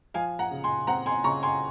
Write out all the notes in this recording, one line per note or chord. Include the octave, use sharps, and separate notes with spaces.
F3 F5 G#5
F#5 A#5
C#3
G#5 C6
C4 F#5 A#5
G#5 C6
C#3 A#5 C#6
G#5 C6